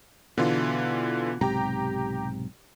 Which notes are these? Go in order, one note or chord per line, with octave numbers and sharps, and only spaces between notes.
B2 D3 E3 F4
B1 G#2 C3 G4 G5 A#5